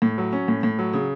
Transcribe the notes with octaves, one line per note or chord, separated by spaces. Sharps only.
A2
F#3
C#4
A2
A2
F#3
C#3